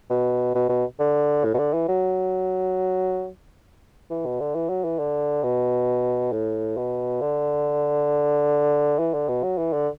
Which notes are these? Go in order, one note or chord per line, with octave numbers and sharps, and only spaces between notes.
B2
B2
B2
D3
A2
B2
D3
E3
F#3
E3
B2
D3
E3
F#3
E3
D3
B2
A2
B2
D3
E3
D3
B2
F#3
E3
D3